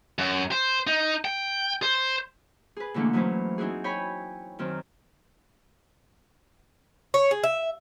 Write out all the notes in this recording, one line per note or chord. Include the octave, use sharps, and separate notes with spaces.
F#2
C5
D#4
G5
C5
G#4 B4
B2 D3 E3 A3 A#3
E3 F#3 A3 C#4 B4 C5
C4 D#4 E4 F#4 G#4
C#5 G5 G#5 B5
F#2 D#3 C4
C#5
G#4
E5